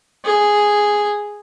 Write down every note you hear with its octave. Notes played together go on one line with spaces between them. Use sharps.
G#4